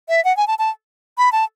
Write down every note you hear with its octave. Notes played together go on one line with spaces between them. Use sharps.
E5
F#5
G#5
A5
A5
B5
A5